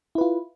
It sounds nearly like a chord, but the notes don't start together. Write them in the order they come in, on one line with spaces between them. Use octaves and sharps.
E4 B4 F4